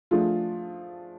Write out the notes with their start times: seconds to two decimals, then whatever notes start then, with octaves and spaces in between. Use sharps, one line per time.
0.11 F3 A3 D4 F4 G#4